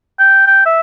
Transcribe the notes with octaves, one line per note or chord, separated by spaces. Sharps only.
G5
G5
E5